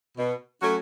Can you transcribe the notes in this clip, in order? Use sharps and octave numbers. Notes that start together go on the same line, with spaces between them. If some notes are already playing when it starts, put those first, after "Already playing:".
B2
F#3 A3 C#4 F#4